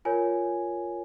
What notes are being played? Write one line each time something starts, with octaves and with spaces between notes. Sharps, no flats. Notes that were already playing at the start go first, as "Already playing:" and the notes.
F4 A#4 C#5 G#5